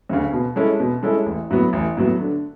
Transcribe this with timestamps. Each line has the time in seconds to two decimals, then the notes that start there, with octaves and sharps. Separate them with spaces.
0.09 D2 C#3
0.33 B2
0.56 G#3 C#4 E4 A4
0.80 B2
1.03 G#3 C#4 E4 A4
1.26 A1
1.51 A2 F#3 B3
1.73 A1
1.97 A2 F#3 B3
2.20 D3